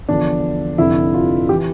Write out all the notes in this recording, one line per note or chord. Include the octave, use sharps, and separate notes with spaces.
E2 D3 F3 D4
F1 F2 D3 E4
F4
E3 G4